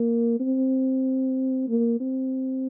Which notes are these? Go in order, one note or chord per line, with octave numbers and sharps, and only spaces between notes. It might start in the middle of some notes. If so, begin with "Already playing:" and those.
Already playing: A#3
C4
A#3
C4